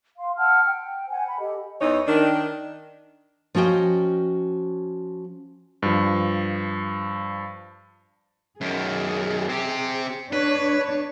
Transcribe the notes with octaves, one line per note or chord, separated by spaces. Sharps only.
F5 C6
F#5 A5 E6 F6
G5
C5 F#5 G#5
B5
G4 A4 D#5
E2 E3 D#4 C#5
D#3 D4
F3 C#4 F#4 D#5 G5
G2 F3
F#2 D#3 G#4
C4 G4
D4 B4 C#5